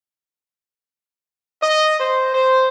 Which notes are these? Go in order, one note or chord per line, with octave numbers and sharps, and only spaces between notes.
D#5
C5
C5